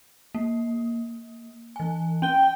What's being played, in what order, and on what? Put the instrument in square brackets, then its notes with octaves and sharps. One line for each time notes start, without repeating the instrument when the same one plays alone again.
[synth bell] A#3
E3 G#5
[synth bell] C#4 G7 [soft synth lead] G5